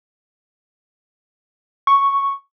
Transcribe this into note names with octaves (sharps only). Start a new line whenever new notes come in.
C#6